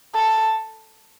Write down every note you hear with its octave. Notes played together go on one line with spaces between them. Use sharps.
A4